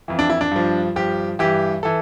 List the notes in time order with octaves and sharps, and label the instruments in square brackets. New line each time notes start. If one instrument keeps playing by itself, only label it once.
[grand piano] F2 E3
D4
E4
D4
G2 F3
G2 F3 G4
G2 E3 G4
E3 A4